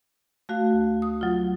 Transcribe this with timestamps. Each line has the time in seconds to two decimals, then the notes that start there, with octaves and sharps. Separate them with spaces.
0.49 A3 F#4 F5
0.73 D2
1.02 D#6
1.21 F#3 F4